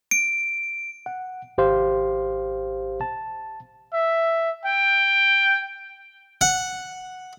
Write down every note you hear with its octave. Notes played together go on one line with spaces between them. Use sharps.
D7
F#5
G#1 G4 C5 F5 C6
A5
E5
G5
F#5